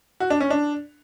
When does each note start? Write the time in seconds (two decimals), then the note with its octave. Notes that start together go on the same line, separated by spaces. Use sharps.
0.20 F#4
0.30 D4
0.40 C#4
0.50 D4